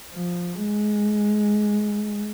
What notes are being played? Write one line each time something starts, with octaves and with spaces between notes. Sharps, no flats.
F3
G#3